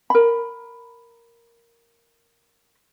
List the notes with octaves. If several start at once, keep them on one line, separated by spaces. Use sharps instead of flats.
A#4 B5